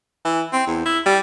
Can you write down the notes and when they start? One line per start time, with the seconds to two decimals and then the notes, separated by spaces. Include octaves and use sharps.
0.25 E3
0.53 C4
0.67 E2
0.86 E4
1.06 G3